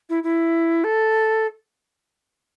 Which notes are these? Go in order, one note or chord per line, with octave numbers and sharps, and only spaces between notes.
E4
E4
A4